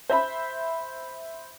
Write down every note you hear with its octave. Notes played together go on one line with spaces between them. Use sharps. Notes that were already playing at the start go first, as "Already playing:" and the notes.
C5 E5 B5